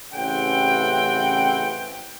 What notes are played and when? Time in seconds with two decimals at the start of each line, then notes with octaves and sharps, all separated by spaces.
0.14 A1 C#3 E3 C4 F#5 G5